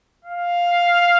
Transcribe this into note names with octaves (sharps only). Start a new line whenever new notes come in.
F5